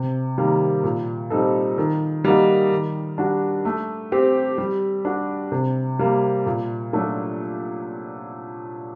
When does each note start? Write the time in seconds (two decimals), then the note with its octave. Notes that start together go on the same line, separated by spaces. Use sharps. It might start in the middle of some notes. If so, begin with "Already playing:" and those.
Already playing: C3
0.38 D#3 G3 A#3
0.84 A#2
1.30 G3 C4 D#4 A4
1.78 D#3
2.24 G3 A#3 D#4 F#4
2.72 D#3
3.18 G3 D4 F#4
3.65 A3
4.12 C4 G4
4.58 G3
5.05 D4 F#4
5.52 C3
5.99 G3 A#3
6.46 A#2
6.93 F#3 A3 D4